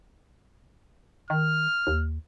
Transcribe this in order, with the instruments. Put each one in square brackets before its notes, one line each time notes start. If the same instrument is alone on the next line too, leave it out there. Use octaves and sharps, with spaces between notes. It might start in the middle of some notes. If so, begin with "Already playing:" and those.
[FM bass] D#3 [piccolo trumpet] F6
[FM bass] D#2